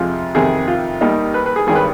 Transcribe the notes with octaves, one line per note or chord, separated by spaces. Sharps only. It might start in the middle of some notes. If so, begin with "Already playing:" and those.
Already playing: F2 C3 F3 G#3 F4
F2 C3 D#3 G#4
F4
D#2 D#3 G3 D#4
B4
B4
G#4
G#1 G2 D#3 G3 G#4
B4